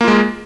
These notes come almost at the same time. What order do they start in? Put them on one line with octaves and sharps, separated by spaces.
A#3 F4 G#3